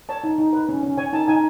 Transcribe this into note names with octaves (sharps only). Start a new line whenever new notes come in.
C#5 A5
D#4
D#4
B4
C#4
C#4
C#5 G#5
D#4 A5
D#4 G#5